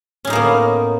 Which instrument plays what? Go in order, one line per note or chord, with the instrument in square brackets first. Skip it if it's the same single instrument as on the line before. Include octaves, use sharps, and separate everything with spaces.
[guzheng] C#4
A2
D#4
A#3
B3